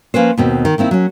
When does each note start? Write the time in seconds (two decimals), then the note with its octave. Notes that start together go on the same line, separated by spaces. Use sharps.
0.14 F3 A#3 C#4 B4 C5
0.37 D#2 B2 C4
0.65 D#3
0.78 D#3 A#3 C4 E4
0.91 F#3 C#4